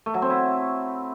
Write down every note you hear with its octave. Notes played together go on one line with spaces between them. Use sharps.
A3
F#3
C4
E4